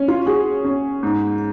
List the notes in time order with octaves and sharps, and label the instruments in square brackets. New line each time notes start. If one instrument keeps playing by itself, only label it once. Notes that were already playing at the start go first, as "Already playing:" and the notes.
Already playing: [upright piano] C#4
[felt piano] F4
[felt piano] F#4 [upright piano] G#4
[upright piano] C#4
G#2